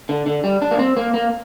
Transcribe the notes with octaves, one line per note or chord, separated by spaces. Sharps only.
D3
D3
G3
D4
A#3
C4
A#3
A#3